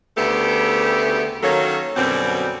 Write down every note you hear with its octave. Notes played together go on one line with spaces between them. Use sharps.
D2 C#3 A3 B3 G4 A4
D#3 F#3 A#3 C#4 A4 C#5
F#2 B2 D3 G3 C4